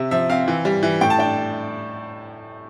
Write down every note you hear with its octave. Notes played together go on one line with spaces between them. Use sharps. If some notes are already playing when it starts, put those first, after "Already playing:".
Already playing: C3 E5
F3 E5
C4 F5
E3
G3
E3
A2 G5
A5
D4 G5